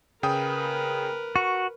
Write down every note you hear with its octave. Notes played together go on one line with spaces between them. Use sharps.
C#3 A#4 B4 G5 D#6
F#4 C#6